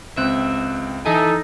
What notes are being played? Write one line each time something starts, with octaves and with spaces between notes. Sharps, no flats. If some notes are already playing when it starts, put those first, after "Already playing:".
C#2 C4 E5 F#6
E3 D#4 A4 E5 G#5